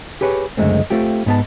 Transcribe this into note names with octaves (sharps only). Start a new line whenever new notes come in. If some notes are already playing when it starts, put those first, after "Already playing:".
G4 G#4 B4 C#5
C#2 F#2 D3 G#3 A3 C4
A3 C4 F4 G4
G#2 B3 A5